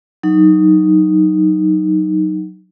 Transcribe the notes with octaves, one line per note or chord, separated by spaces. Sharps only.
F#3 D#4